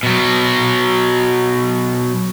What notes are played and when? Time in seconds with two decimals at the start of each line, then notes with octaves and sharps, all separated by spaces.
0.03 B2 F#3